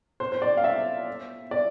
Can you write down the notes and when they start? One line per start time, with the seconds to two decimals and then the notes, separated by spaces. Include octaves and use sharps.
0.20 C5
0.32 C5
0.42 D5
0.57 F5
0.64 E5
1.51 D5